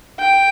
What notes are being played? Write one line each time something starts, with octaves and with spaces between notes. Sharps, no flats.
G5